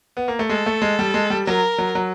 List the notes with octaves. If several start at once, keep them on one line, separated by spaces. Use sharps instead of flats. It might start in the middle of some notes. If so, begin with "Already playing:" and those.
B3
A#3
A3
G#3 A4
A3
G#3
G3
G#3
G3
F#3 A#4
F#3
F#3